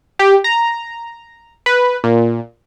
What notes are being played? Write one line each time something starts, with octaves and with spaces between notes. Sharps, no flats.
G4
A#5
B4
A#2